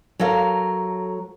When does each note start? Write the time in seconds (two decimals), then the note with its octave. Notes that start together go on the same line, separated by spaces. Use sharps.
0.19 F#3 A4 A#4 F5